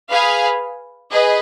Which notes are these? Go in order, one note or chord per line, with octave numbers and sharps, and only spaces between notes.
G#4 B4 F5 G#5
G#4 B4 D#5